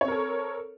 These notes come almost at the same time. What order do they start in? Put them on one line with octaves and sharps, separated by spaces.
C#5 C4 A#4 A4